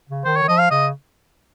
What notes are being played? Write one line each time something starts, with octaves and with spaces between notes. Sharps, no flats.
C#3
D#3 C5
C#5
D#3
F3 D#5
F5
C#3 D#5